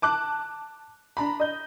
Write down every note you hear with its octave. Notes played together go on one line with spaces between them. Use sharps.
A5 D6 F#6
D4 A#5 B5
D#5 G6